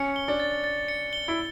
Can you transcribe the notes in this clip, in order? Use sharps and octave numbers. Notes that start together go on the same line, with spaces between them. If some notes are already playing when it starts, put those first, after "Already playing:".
Already playing: C#4 C#7
G7
D4
A6
A6
C#7
G7
E4